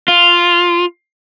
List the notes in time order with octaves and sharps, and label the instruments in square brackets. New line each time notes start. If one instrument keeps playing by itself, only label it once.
[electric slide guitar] F4